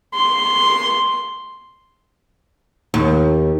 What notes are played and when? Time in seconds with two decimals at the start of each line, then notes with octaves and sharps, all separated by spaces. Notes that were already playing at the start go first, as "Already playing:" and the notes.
0.14 C6
2.94 D#2